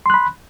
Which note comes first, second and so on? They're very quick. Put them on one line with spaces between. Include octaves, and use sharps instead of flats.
C6 F#6 B5